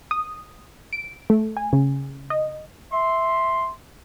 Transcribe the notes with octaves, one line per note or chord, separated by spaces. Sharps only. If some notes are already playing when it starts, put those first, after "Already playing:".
D#6
D7
A3
G#5
C#3
D#5
E5 C6